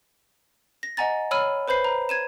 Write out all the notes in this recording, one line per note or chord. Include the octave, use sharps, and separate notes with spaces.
A#6
D#5 F#5 G#5 A#5 A6
C#5 B5 E6 F6 D#7
B4 C5 B5 G6 C7
A#5
G#6 D#7 E7